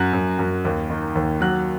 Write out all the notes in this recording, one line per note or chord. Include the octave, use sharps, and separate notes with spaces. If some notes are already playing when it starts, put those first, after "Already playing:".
Already playing: F#2 F#3 F#6
F#2
F#2
D#2
D#3
D#2
F#3 F#6